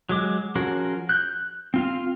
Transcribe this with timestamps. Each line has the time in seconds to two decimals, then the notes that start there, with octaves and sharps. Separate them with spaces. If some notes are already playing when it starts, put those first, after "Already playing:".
0.09 F#3 G#3 D6
0.55 F3 C#4 F#4 G#4 A#4
1.09 F#6 G6
1.74 C4 F4 F5